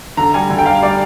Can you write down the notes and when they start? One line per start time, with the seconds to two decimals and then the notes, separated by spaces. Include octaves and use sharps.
0.17 D3 A#5
0.34 G3 G#5
0.50 D3 G#5
0.58 G5
0.66 G3 F5
0.82 G3 D5